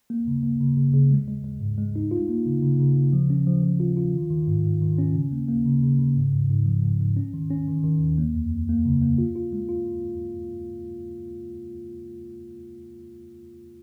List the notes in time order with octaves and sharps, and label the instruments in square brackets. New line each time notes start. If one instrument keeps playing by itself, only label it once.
[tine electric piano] A#3
C#3
A#3
C#3
C#3
C#3
G#3
G#3
G#3
G#2
G#3
D#4
F4
A#3
C#3
C#3
C#3
C#3
F3
C#4
F3
F3
F4
F4
D#3
D#3
G#2
G#2
D#3
C#4
C#3
A#3
A#3
C#3
C#3
C#3
G#2
G#2
G#2
F3
G#2
G#2
C#4
D#3
C#4
D#3
D#3
D#2
A#3
F2
F2
A#3
C#3
A#3
F4
F4
G#3
F4